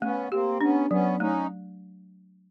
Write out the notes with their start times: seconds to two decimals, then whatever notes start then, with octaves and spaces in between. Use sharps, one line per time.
0.02 A3 B3 C#4
0.31 A#3 C4 G4
0.61 B3 C#4 D4
0.90 F#3 B3 C#4
1.20 A3 C#4 D#4